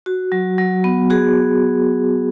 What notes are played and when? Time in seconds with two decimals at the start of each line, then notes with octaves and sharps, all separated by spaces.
0.06 F#4
0.32 F#3
0.58 F#3
0.84 B3
1.10 F#4 G#4